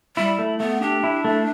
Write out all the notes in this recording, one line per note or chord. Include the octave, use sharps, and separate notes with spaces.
G3 E4
A3
A3 B3
D4 G4
E4
A3